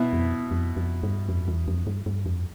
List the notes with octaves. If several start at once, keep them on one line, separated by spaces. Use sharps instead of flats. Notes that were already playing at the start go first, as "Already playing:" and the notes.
Already playing: B2 B3 E4
F2
F2
F2
G2
F2
E2
F2
G2
G2
F2